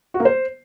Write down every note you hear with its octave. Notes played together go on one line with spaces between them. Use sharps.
F#4
A#3
C5